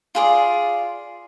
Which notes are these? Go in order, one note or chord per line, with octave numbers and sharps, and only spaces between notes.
F4 G#4 D5